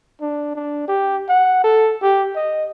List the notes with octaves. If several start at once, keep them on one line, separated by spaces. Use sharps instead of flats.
D4
D4
G4
F#5
A4
G4
D#5